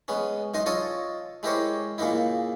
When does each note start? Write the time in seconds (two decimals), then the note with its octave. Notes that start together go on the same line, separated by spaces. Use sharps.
0.08 G#3 B3 C#4
0.54 F#2 D#4 D#5 C6
0.66 F4 A4 C#5 D#5 A#5 C6
1.43 G#3 E4 G4 A#4 C5 C#5
1.98 A#2 C#3 A#3 D#4 E4